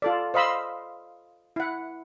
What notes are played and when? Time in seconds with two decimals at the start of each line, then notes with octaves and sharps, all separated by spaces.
0.02 F4 A4 D5
0.34 C5 D#5 F5 B5 C6 E6
1.56 E4 F#5